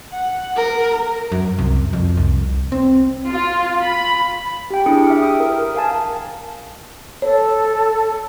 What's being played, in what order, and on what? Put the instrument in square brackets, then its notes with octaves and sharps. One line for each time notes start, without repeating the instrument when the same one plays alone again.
[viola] F#5
A#4
[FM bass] F#2
C2
F2
C2
C4
[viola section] F4
B5
[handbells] G4 G5
D4 E4 G4 G#4 D#6 C#7
E5 F6
G5 D#6
A#4
A#4 F5 G#5 A5
[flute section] A4 [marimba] C#5